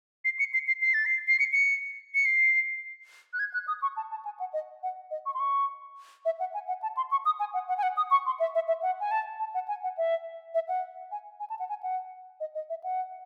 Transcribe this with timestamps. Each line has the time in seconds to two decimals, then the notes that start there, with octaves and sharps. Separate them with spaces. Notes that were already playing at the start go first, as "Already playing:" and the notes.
0.25 C7
0.39 C#7
0.54 C7
0.68 C7
0.82 C7
0.94 A6
1.06 C7
1.28 C7
1.39 C#7
1.53 C#7
2.15 C#7
2.25 C7
3.33 F#6
3.39 G#6
3.54 F#6
3.67 D#6
3.82 C#6
3.97 A5
4.11 A5
4.25 G#5
4.40 F#5
4.53 D#5
4.83 F#5
5.11 D#5
5.26 C#6
5.34 C6
5.40 C#6
6.25 E5
6.40 F#5
6.54 G#5
6.68 F#5
6.82 A5
6.97 C6
7.11 C#6
7.25 D#6
7.40 G#5
7.54 F#5
7.68 F#5
7.78 G#5
7.83 F#5
7.97 D#6
8.11 C#6
8.26 C6
8.40 E5
8.55 E5
8.68 E5
8.83 F#5
9.00 G#5
9.11 A5
9.39 A5
9.54 F#5
9.68 G#5
9.83 F#5
9.97 E5
10.54 E5
10.68 F#5
11.11 G#5
11.40 G#5
11.50 A5
11.59 F#5
11.69 G#5
11.83 F#5
12.40 D#5
12.55 D#5
12.69 E5
12.84 F#5